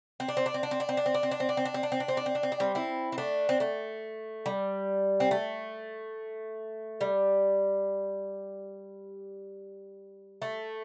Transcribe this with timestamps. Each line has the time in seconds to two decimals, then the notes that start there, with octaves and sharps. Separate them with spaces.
0.20 C4
0.28 D4
0.37 C4
0.46 D4
0.54 C4
0.63 D4
0.71 C4
0.80 D4
0.89 C4
0.97 D4
1.06 C4
1.14 D4
1.23 C4
1.31 D4
1.40 C4
1.49 D4
1.57 C4
1.65 D4
1.74 C4
1.83 D4
1.92 C4
2.00 D4
2.08 C4
2.17 D4
2.26 C4
2.35 D4
2.43 C4
2.52 D4
2.60 G3 C4
2.75 C4 E4
3.12 C4
3.18 A3 D4
3.49 C4
3.60 A3
4.46 G3
5.20 C4
5.31 A3
7.01 G3
10.42 A3